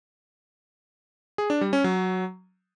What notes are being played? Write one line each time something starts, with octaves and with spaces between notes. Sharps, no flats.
G#4
D4
G3
C#4
F#3